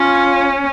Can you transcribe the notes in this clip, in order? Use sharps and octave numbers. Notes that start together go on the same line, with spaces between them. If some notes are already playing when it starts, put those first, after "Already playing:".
Already playing: C#4 F4